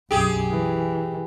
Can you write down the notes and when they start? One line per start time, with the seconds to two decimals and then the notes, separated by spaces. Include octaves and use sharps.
0.11 B1 F#2 G4 G#4
0.51 E3